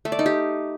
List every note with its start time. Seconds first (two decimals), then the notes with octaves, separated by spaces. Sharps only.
0.05 A3
0.12 D5
0.19 D#4
0.26 G4